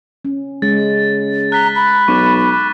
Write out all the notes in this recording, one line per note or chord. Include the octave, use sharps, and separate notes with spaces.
C#4
C#3 G#3 A6
A#5 F#6 B6 G7
B5
B1 C#6 D6 F#6